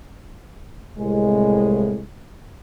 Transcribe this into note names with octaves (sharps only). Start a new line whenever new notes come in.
C2 A2 G#3